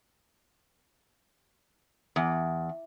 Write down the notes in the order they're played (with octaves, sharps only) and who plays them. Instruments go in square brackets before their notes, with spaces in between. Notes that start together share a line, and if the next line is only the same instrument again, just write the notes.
[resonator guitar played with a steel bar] E2